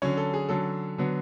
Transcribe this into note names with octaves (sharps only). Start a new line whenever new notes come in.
D3 F#3 C#4 C#5
A4
G#4
D3 F#3 C#4 A4
D3 F#3 B3